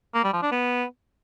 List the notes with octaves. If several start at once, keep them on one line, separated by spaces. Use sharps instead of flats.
A#3
G3
F3
D4
B3